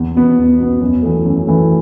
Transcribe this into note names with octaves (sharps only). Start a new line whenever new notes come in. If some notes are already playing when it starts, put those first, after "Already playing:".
Already playing: E2
B2 B3
E2
B2 B3
F#2
E3 A3
F#2
E3 A3